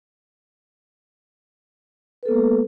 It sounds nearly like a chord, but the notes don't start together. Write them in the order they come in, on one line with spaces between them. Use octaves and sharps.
B4 A4 B3 A#3 G#3